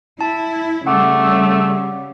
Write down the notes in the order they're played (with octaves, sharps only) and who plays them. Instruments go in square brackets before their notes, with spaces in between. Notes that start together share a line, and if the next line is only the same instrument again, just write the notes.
[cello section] E4 [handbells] A5
[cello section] C#3 G3 [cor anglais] A3 [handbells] F#5 D6